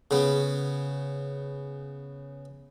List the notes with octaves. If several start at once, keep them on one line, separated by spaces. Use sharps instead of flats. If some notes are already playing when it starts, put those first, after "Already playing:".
C#3 B3